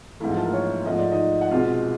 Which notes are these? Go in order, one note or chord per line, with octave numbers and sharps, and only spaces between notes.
G#2 E3 A3 E4
F3 F4
A3 A4
A#3 A#4
C#4 C#5
G#2 F3 A3 D#5
D5
D#4 D#5
F#5
C2 B2 G#3 F4 F5